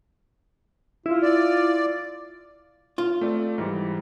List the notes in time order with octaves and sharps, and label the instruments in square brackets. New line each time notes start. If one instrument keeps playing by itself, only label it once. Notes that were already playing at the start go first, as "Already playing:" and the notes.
[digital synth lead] E4 [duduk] F4
[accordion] D5
[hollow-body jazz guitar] F4
[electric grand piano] A3 C4 D5
G#2 E3 G3